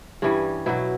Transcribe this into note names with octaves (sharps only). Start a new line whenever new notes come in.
G2 E3 G3 C#4
B2 F#3 E4